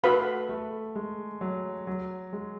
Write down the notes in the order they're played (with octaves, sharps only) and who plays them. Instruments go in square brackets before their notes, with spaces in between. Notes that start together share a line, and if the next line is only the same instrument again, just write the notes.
[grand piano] A3 [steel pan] F#4 B4 F5 B5
[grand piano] A3
G#3
F#3
F#3
G#3